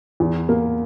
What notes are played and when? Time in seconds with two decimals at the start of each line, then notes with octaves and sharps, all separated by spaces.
0.20 E2
0.49 A#3